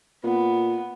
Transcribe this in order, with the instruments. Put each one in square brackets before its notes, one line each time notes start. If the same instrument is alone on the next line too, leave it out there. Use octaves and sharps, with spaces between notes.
[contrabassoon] A#2 [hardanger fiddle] B3